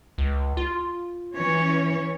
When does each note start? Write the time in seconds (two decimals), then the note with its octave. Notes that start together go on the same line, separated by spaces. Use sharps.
0.18 C#2
0.57 F4
1.35 E3 C#4 C#5